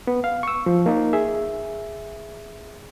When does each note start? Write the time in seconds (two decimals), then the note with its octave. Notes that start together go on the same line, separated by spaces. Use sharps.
0.07 B3
0.24 F5
0.43 C#6 E6
0.66 F3
0.86 A#3 D#4
1.13 G#4 E5